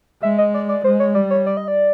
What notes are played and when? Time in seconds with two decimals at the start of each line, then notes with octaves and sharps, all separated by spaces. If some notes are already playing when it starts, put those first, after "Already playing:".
0.23 G#3 E5
0.38 D#5
0.54 D5
0.69 D5
0.84 G#3 C5
1.00 C#5
1.15 G3 D5
1.31 C#5
1.46 D5
1.57 D#5
1.68 D5